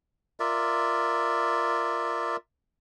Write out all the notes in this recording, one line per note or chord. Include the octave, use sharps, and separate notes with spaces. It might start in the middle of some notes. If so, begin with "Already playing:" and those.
F4 A#4 D5 E5